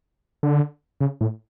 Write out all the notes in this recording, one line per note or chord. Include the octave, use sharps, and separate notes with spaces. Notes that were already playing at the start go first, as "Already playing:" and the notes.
D3
C#3
A2